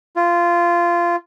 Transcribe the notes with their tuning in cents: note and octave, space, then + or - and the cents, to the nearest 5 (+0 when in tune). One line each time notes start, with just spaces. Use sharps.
F4 -15